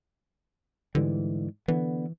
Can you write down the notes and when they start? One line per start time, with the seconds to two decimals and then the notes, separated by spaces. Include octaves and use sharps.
0.95 G#2 D3 E3 G3
1.68 D3 E3 B3